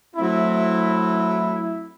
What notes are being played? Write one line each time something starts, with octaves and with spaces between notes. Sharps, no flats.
F#3 A3 C4 E4